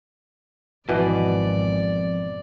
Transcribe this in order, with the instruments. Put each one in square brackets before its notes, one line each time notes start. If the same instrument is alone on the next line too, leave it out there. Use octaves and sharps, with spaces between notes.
[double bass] G#1 [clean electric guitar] F2 [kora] B2 E3 D#5 [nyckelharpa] D5